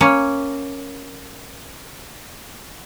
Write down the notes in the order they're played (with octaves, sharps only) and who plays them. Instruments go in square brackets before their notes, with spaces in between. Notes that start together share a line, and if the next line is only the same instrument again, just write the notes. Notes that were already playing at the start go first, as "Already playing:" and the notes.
[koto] A#3 C#4 C#5